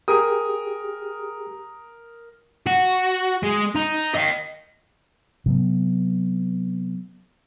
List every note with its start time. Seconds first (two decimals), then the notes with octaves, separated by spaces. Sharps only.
0.08 G4 G#4 A#4 D#6
2.66 F#4
3.43 G#3
3.76 D#4
4.16 D#5 F5
5.46 C3 F#3 B3